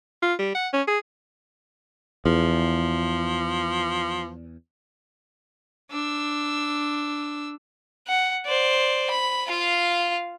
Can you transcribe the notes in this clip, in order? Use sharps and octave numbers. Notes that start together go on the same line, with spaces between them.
F4
G3
F#5
C#4
G#4
E2 F3
D4 E6
F#5
C5 D5
B5
F4 F5